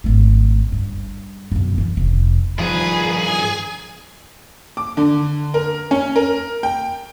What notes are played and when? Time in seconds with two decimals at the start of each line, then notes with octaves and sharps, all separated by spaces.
0.04 G#1 A3
0.72 G2
1.52 B1 F#2
1.78 E3
1.97 F1
2.59 G2 D#3 F3 G#4 B4
3.24 G#5
4.77 D6
4.97 D3
5.54 A#4
5.91 C#4
6.16 A#4
6.63 G5